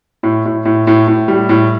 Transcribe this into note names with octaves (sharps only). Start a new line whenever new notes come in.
A2
A2
A2
A2
A2
G3
A2